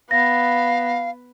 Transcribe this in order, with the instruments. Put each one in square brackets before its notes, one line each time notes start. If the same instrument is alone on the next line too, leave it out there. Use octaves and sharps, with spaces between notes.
[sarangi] B3 [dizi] F5 [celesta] A#6